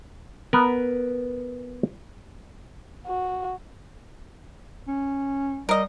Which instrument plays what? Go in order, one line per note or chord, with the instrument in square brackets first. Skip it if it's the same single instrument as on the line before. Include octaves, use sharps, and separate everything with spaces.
[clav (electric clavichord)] B3 A#4 B4
[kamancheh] F#4
[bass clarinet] C#4
[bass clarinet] G3 [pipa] A#4 D#5